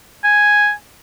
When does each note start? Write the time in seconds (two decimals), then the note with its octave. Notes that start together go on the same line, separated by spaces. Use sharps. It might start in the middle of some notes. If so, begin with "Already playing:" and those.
0.24 G#5